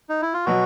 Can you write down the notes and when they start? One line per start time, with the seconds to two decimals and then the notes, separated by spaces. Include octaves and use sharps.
0.09 D#4
0.22 E4
0.33 F4
0.46 B2 F#3 F#4